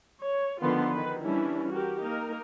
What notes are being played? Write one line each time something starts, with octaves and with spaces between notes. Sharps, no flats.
C#5
D3 D#3 F3 B3 F4 C6
D#3 B4
E3 G3 C#4 D4 E4
F#4 G4 A#4
A#3 D#4 A#4